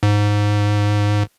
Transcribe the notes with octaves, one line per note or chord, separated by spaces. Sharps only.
G#2